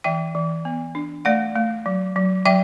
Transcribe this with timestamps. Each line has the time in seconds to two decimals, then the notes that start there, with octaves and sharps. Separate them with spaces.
0.04 E3 E5 G5
0.35 E3
0.65 B3
0.95 D4
1.25 A3 D5 F#5
1.56 A3
1.86 F#3
2.16 F#3
2.46 F#3 E5 G5